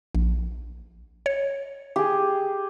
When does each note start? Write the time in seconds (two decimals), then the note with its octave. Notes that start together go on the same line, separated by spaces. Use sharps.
0.15 A#1
1.26 C#5
1.96 G4 G#4